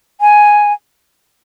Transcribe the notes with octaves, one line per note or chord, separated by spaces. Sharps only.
G#5